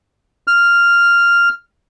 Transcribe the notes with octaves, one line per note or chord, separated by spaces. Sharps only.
F6